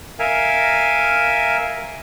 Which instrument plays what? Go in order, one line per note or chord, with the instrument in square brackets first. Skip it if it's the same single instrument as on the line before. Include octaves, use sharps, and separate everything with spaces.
[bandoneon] A#4 E5 F5 G#5